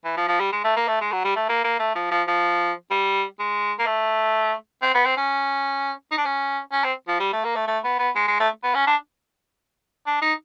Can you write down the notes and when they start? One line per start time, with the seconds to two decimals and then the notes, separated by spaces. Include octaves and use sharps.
0.05 E3
0.17 F3
0.28 F3
0.40 G3
0.52 G#3
0.64 A3
0.76 A#3
0.88 A3
1.01 G#3
1.12 F#3
1.24 G3
1.36 A3
1.49 A#3
1.64 A#3
1.79 A3
1.95 F3
2.11 F3
2.28 F3
2.91 G3
3.39 G#3
3.79 A#3
3.86 A3
4.82 C4
4.94 B3
5.05 C4
5.17 C#4
6.11 D#4
6.18 D4
6.25 C#4
6.72 C#4
6.84 C4
7.08 F3
7.20 G3
7.33 A3
7.44 A#3
7.56 A3
7.67 A3
7.84 B3
7.99 B3
8.16 G#3
8.28 G#3
8.40 A3
8.63 B3
8.75 C#4
8.87 D4
10.07 D4
10.22 D#4